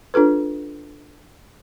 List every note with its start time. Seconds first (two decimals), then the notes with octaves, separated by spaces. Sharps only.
0.14 D4 F4 A4 B4